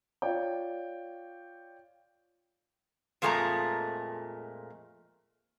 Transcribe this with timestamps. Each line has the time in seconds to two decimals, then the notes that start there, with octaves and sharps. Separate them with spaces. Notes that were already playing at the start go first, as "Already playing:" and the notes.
0.22 F4 C#5 D5 G5
3.22 F2 A#2 G#3 A3 G#5 A#5